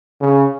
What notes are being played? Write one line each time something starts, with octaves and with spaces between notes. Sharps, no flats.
C#3